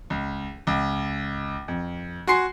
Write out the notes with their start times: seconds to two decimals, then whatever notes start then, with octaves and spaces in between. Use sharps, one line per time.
0.10 C#2
0.67 C#2
1.68 F2
2.27 F#4 G#5 C6 C7